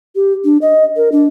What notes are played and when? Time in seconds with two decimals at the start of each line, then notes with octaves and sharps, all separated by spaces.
0.16 G4
0.45 D4
0.62 D#5
0.96 A#4
1.12 D4